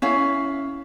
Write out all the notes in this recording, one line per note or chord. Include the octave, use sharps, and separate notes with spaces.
C#4 E4 F5